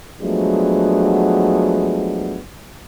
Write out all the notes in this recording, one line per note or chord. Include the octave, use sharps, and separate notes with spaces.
F3 F#3 G#3 A3 B3 D4